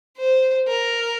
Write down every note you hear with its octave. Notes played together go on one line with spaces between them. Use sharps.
C5
A#4